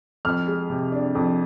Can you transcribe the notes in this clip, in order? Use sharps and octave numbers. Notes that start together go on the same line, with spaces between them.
F2 F6
G#3
C3
D4
F2